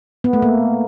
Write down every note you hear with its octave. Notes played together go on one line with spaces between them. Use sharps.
B3
A3
A#3